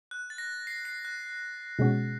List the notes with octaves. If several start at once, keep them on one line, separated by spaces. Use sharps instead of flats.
F#6
A6
A#6
C7
C7
F#6
B2 G#3 C#4 F#4